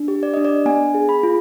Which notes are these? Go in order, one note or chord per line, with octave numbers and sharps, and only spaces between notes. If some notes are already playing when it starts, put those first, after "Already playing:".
Already playing: D4
G4
D5
D4 D#5
D5
B3 G#5
G#4
B5
F4